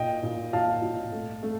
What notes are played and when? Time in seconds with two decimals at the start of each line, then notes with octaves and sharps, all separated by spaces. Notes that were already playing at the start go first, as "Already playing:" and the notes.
Already playing: A#2 D#5 G5
0.23 A#2
0.53 A#2 F5 A5
0.82 A#2
1.12 A3
1.43 A3